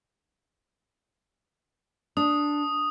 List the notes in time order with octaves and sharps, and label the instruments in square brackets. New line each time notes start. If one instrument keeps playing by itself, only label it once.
[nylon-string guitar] D4 [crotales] D#6